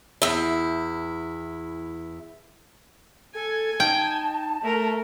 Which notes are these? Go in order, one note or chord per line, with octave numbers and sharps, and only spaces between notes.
E2 E4
A4 G#5
D#4 G5 A5
A3 A#4 E5